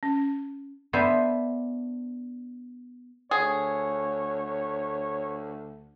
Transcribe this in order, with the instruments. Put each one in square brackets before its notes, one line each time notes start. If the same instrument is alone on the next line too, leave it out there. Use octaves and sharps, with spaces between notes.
[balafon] C#4
[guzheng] B3 D4 C5 E5 G#5
[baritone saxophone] D2 [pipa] G#4 [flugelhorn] C#5